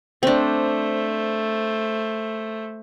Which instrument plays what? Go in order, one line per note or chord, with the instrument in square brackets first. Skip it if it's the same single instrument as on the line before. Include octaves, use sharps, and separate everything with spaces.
[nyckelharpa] A3 C5 [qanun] C4 D4